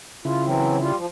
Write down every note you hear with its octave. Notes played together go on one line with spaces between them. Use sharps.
C#3 E4 F4
E3 F#3 C4
G3 F4
F3